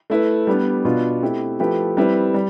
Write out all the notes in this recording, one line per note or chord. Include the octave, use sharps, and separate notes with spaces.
A3 E4 B4
G3 B3 D4
B2 B3 D4 F4
A3 C4 E4 G4
F3 A3 E4 G4 B4
G3 C4 E4 B4
G3